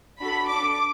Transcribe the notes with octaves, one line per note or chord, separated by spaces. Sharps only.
D4 F#4 A4 B5
D4 A4 D6